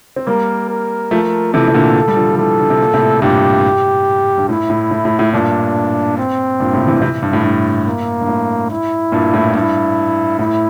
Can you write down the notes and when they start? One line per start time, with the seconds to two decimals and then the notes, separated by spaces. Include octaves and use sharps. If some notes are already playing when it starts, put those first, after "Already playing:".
0.16 C4
0.27 G3 A#3 A#4
0.69 A#4
1.11 F3 A3
1.53 C3 E3 A4
1.68 C3
1.74 A#2 D3
2.08 G3
2.17 D3 F3
2.31 F3
2.37 E3 G3 A4
2.59 D3
2.70 C3
2.82 A#2
2.93 A2 C3
3.22 G2 A#2 G4
4.38 G2
4.49 A2 E4
4.70 A2
4.91 A2
5.05 A2
5.19 A2
5.32 G2 A#2 D4
6.17 C4
6.60 G2 A#2
6.73 A2 C3
6.87 C3 E3
7.01 C3 E3
7.22 G2
7.33 A2
7.44 G2
7.86 A#3
8.21 G2
8.28 A2
8.71 E4
9.12 G2 A#2
9.34 A2
9.55 G2 E4
10.39 A2 E4